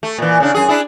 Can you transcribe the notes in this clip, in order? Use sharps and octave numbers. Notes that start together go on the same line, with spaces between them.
A3
A#2 E3
C#3 D4
F#2 G#4
D4 E4 G#4